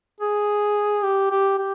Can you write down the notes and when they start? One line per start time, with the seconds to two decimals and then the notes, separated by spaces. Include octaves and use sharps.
0.20 G#4
1.03 G4
1.31 G4
1.58 G4